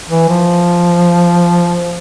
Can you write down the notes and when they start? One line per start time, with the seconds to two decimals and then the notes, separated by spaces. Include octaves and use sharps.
0.09 E3
0.29 F3